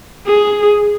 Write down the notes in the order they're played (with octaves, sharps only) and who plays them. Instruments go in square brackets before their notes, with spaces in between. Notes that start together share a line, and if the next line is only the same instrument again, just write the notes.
[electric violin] G#4